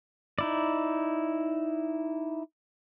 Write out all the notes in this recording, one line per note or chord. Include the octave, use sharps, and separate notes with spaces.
D#4 E4 D5